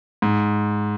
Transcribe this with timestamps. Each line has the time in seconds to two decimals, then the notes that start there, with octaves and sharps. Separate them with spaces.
0.22 G#2